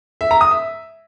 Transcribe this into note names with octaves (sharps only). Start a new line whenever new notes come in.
E5
A#5
D#6
E5